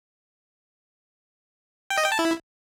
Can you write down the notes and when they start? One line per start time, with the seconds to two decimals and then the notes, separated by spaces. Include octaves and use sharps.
1.90 G5
1.98 D#5
2.05 G5
2.12 A5
2.19 E4